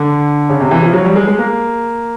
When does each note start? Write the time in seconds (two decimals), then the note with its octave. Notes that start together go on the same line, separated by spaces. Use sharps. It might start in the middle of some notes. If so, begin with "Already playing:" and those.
Already playing: D3
0.49 C#3
0.60 C3
0.71 E3
0.82 F3
0.93 F#3
1.05 G3
1.16 G#3
1.27 G#3
1.38 A#3